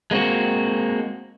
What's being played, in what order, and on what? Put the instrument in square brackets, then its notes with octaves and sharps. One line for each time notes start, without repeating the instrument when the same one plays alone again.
[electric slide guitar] G#3 A#3 C4 F#4